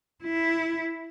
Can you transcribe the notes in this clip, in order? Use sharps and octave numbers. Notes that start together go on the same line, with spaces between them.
E4